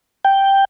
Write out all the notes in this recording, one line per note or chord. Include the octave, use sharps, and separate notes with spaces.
G5